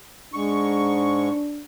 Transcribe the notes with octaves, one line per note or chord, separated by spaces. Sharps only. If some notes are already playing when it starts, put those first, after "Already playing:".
G#2 D4 C#6